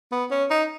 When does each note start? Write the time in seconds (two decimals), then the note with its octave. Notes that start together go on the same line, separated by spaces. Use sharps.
0.12 B3
0.31 C#4
0.50 D#4